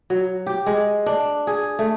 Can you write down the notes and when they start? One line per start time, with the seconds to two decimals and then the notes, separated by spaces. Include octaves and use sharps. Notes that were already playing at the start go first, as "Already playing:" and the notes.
0.10 F#3
0.47 G4
0.66 G#3
1.06 D4
1.47 G#4
1.79 A3